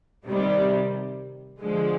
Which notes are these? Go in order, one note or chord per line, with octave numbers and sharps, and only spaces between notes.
C3 D#3 G3
D3 F3 G#3